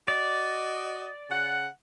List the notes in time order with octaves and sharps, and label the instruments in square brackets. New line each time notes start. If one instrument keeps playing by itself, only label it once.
[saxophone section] F#4 D#5 [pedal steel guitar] D5
[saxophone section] C#3 F#5